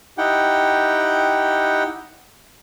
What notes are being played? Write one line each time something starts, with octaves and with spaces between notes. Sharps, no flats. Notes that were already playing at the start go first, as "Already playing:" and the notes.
D#4 E4 G4 F#5 G5